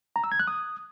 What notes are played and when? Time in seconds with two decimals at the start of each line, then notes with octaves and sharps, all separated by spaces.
0.16 A#5
0.24 E6
0.32 G#6
0.39 F#6
0.47 D#6